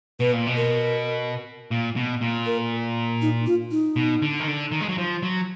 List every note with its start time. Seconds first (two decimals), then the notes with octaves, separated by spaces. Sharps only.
0.20 B2 B4
0.33 A#2
0.47 B2
0.57 A#4
1.71 A#2
1.96 B2
2.21 A#2
2.46 A#4
3.22 D#4
3.46 F4
3.71 D#4
3.96 B2
4.22 D3
4.40 D#3
4.48 D3
4.72 D#3
4.81 G#3
4.89 F#3
4.98 F3
5.23 F#3